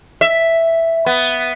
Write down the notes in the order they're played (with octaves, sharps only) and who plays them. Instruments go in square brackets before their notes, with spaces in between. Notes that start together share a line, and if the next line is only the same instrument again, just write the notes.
[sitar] E5
B3